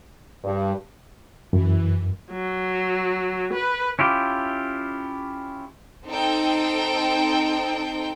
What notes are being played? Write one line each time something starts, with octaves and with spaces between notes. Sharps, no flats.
G2
F#2 E3
F#3
B4
C#4 E4 F4 G4
C4 D#4 A4 G5